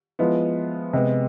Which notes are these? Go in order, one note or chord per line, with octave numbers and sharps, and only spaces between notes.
F3 G#3 B3 E4
C3 G#3 B3